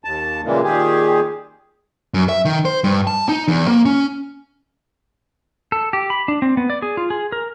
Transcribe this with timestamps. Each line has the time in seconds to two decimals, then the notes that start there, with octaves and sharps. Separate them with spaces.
0.05 D#2 A5
0.45 A#2 C#3 E3 G3 G#3 A#3
0.63 A#2 D#3 G4 G#4
2.14 F#2
2.29 E5
2.45 D#3
2.65 C5
2.84 G2
3.07 A5
3.29 D#4
3.48 E2
3.68 A#3
3.86 C#4
5.72 A4
5.93 G4
6.10 B5
6.28 D4
6.42 C4
6.57 B3
6.70 D5
6.82 G#4
6.97 F4
7.10 G#4
7.32 A#4